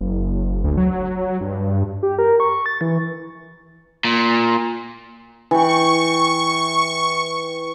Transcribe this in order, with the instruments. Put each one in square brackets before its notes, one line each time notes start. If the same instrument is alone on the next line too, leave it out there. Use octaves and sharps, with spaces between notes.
[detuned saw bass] F#1
D2
F#3
G2
[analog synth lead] G4
A#4
C#6
A6
E3
[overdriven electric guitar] A#2
[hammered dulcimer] E3 G5 [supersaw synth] C#6